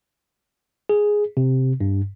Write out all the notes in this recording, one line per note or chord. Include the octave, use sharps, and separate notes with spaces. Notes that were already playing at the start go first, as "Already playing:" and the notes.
G#4
C3
G2